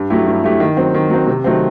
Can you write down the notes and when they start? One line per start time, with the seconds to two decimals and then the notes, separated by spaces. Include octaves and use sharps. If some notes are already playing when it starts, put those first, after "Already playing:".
Already playing: G2
0.10 F#3 A3 E4 G4
0.26 G2
0.44 F#3 A3 E4 G4
0.60 D#3
0.77 F#3 C4
0.94 D#3
1.10 F#3 C4
1.27 C3
1.44 D#3 F#3 A3 C4